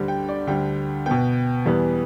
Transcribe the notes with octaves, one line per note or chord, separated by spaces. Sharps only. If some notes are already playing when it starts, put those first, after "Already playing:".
Already playing: D2 D3 G3
G5
D5
D2 D3 G3 G5
B2 B3 G5
E2 E3 G3 B3